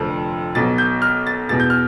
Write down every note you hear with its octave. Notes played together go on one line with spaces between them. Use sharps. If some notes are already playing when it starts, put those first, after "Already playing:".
Already playing: F1 F2 D3 F3
B1 B2 A6
G6
F6
A6
E2 B2 A6
G6
F6